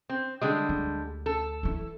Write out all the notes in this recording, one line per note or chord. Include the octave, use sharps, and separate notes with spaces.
C4
D3 G3 G#3
D2
A4
E3 E4